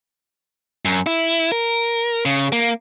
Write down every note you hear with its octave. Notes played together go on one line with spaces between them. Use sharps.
F#2
E4
A#4
C#3
A#3